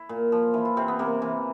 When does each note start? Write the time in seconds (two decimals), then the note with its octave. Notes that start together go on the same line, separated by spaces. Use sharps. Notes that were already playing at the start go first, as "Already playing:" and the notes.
Already playing: E4
0.09 A#2
0.32 F3
0.54 E3 E4
0.65 F4
0.77 C3 C4
0.88 B3
0.99 C3 A#3
1.22 E3